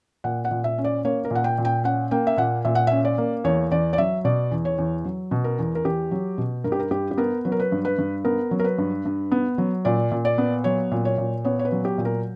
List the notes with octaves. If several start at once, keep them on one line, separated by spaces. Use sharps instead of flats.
A#2 F#5
F#5
A#2
E5
C#4
D5
A#3 C#5
A#4
A#2 F#5
G5
A#2
G5
C#4 F#5
A#3 G5
E5
A#2 F#5
A#2 E5
F#5
C#4 E5
D5
A#3
E2 C#5
E2 D5
D5
F#3 E5
B2 D5
E2
C#5
E2
F#3
B2
A#4
E2
A#4
E2 G4
F#3
B2
G2 A#4
G4
A#4
G2 G4
G4
B3 A#4
F#3 B4
A#4
B4
G2
B4
G2
B3 A#4
F#3
A#4
B4
G2
G2
B3
F#3
A#2 D5
A#2
D5
B3
F#3 C#5
A#2
C#5
A#2
B3 C#5
C#5
B4
F#3
G4
A#2
A#4